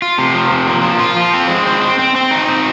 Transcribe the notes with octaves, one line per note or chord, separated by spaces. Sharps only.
F4
C3
F3
C3
A#3
F3
F4
F3
C4
G#3
C4
C4
C4
C4
D#4
C4